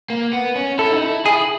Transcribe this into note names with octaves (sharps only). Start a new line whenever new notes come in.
A#3
B3
C#4
E4 A4
D#4
E4
E4 G#4